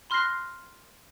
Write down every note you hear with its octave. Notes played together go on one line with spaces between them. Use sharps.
B5 C6 F6 F#6 A#6 C7